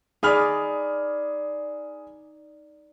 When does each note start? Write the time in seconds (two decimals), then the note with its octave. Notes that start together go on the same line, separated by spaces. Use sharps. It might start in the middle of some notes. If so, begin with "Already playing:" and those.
0.23 D#4 G#4 D5 B5 F6